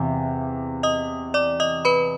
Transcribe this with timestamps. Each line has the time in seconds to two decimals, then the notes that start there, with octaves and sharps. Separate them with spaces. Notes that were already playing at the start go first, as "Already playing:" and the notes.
Already playing: E2 C3 E3 F5
0.83 D#5 D#6
1.34 D5 D6
1.60 D#5 D#6
1.85 B4 B5